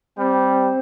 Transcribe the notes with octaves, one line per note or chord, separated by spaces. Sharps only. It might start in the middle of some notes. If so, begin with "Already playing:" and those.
G3 C4 C5